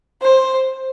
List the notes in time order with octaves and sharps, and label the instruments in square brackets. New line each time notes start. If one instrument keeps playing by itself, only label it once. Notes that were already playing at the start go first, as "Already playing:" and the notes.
[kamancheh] C5